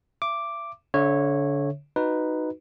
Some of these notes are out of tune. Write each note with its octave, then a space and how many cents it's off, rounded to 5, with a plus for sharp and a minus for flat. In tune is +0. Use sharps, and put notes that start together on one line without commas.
E5 +35 D6 +0
D3 -30 C#5 -15 E5 -5
D#4 +0 F#4 +0 B4 +0